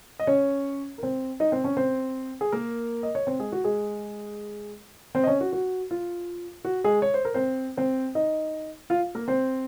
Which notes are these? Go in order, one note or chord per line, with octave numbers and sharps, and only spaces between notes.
D#5
C#4 C#5
A#4
C4 C5
D#4 D#5
C4 C5
C#4 C#5
C4 C5
G#4
A#3 A#4
D#5
C#5
C4 C5
G#3 G#4
F#4
G#3 G#4
C4 C5
D#5
C#4 C#5
F#4
F#4
F4
F#4
G#3 G#4
C#5
C5
A#4
C4 C5
C4 C5
D#4 D#5
F4 F5
A#3 A#4
C4 C5